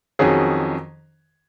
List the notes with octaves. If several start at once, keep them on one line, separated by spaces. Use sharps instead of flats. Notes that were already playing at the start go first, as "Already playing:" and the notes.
F2 D#3 F#3 C#4 G#4